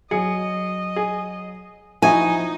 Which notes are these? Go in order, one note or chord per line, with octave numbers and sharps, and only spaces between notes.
F#3 G#4 D#5 C#7
G#4
F3 D#4 E4 F#4 E5 G#5